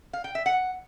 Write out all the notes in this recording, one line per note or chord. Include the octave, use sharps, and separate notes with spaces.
F5
G5
E5
F#5